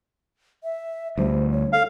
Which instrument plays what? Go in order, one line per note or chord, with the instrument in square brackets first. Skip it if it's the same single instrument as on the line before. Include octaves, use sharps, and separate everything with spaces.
[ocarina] E5
[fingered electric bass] D2 G3 [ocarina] C5
[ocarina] C#5
[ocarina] A4 [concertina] F5